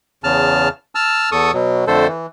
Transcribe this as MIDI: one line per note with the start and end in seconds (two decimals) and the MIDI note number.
0.24 0.69 40
0.24 0.69 49
0.24 0.69 81
0.24 0.69 89
0.95 1.30 81
0.95 1.30 88
0.95 1.30 89
1.32 1.51 40
1.32 1.51 69
1.32 1.51 85
1.32 1.51 87
1.54 1.85 47
1.54 1.85 54
1.87 2.07 41
1.87 2.07 50
1.87 2.07 57
1.87 2.07 69
1.87 2.07 72
2.07 2.26 52